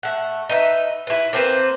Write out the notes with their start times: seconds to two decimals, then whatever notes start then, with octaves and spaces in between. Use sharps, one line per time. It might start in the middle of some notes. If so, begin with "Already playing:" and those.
0.03 A3 F#5
0.49 D#4 B4 E5
1.07 E4 B4
1.33 A#3 C4 B4 C5